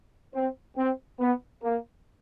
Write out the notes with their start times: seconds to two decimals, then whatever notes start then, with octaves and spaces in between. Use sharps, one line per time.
0.34 C4
0.76 C4
1.19 B3
1.63 A#3